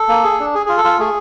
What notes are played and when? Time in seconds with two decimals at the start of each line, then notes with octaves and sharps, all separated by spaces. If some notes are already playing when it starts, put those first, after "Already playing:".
Already playing: A4
0.09 A#3
0.24 G#4
0.39 D4
0.55 G#4
0.66 F4 G#4
0.77 A4
0.84 F4
0.99 A3 G#4